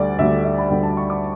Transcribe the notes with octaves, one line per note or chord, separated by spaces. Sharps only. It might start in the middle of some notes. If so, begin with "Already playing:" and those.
Already playing: D2 D3 G3 D5
D2 D3 G3 E5
E5
B5
D2 D3 G3 G5
A5
C#6
D6